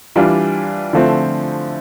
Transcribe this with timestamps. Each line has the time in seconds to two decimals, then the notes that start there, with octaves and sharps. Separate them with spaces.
0.16 E3 G3 D4 F4
0.93 D3 F3 A3 C4 E4